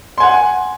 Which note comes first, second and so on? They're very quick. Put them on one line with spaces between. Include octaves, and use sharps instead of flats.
C6 G#5 F#5